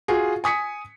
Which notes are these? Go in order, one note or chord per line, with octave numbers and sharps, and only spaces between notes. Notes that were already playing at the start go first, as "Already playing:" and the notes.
F4 F#4 G#4
G#5 D#6 B6 C#7